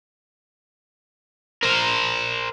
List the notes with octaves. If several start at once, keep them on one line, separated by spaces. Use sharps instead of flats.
A#4 C5